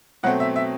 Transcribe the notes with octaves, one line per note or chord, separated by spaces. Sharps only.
B2 F#3 A3 C4 F#5
E5
E5